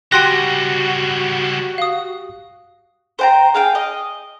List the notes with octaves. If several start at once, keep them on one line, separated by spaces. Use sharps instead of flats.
C#3 G3 F#4 G4 G5 C6 F#6 A#6
F5 D#6
C5 G5 A#5
G#4 F5 G5
D#5